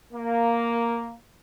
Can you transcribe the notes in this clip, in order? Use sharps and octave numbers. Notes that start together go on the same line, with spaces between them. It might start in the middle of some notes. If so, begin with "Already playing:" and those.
A#3